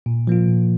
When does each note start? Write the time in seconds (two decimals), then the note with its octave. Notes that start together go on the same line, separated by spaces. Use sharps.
0.06 A#2
0.27 F3 A#3 F4
0.48 A#2